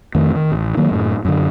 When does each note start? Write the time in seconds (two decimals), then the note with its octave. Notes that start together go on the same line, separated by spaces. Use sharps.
0.15 F2 D#3 A3
0.35 D#3
0.52 A1
0.77 D#3 F#3 A#3
0.91 F#2 A2
1.25 F#2 D3